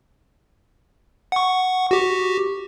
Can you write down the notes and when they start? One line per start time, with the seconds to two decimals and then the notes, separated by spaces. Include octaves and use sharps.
1.32 F#5 C#6
1.91 F#4 G4